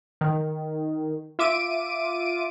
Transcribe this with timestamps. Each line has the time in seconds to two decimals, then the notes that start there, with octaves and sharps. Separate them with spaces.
0.21 D#3
1.39 F4 E5 D6 D7 D#7